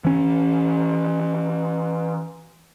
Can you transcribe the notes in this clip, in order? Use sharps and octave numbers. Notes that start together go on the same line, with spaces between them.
E3 C#4